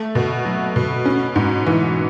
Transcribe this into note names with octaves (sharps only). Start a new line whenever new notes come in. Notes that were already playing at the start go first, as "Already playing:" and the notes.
Already playing: A3
B2
F#3
B2
C#4
G#2
E3